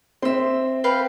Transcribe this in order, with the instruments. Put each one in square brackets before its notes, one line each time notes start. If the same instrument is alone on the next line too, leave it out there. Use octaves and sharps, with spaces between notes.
[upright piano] C4 [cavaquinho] E5 C6
[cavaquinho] B4 F5 G5